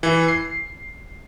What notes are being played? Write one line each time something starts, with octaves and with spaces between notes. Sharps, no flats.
E3
C7